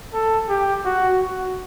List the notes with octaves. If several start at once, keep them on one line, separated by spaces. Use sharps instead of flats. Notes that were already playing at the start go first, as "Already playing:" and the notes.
A4
G4
F#4
F#4